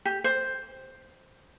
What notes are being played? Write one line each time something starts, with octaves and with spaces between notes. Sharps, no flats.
G4
C5